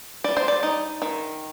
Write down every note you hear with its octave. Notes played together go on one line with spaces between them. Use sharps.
G3 D5
C5
D5
D#4
D#3